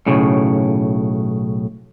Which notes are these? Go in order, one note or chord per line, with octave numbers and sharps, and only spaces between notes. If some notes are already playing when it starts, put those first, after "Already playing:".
B1 A2 C#3